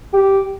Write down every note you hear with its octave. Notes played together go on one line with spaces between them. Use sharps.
G4